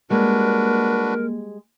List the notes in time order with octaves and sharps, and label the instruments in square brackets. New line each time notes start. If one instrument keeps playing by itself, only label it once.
[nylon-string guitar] G3 G#3 [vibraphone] A#3 [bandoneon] D4 F#4 B4 [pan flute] A#4